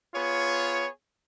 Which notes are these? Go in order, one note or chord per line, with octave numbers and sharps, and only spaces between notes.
B3 F4 G#4 C#5